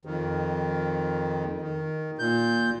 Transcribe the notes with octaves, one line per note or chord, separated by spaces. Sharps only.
F2 D#3
D#3
A#2 G6